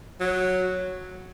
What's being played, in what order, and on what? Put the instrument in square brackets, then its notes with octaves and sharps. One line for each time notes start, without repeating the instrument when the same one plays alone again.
[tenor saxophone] F#3